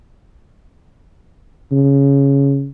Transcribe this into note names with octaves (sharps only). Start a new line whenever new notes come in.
C#3